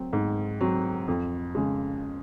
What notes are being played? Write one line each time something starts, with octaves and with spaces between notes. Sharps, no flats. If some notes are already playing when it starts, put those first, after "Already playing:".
Already playing: F#3 C4
G#2
F#3 C4
F2
C#3 G#3